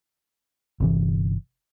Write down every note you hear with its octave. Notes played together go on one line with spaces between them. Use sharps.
G1 C3 E3